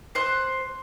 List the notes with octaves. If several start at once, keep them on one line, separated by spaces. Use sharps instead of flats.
C5 C6 F#6